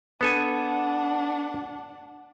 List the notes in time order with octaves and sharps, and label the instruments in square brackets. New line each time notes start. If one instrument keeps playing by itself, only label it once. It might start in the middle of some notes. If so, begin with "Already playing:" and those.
[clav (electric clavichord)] B3 A4 G#5 [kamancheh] D4 F#5